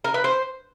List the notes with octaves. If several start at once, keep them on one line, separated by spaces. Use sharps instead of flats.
A#4
B4
C5